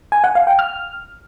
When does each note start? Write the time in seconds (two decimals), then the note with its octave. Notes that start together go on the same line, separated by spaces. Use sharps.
0.12 G#5
0.24 F#5
0.35 F5
0.47 G5
0.59 F6